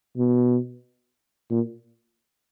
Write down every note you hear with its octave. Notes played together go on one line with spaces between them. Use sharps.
B2
A#2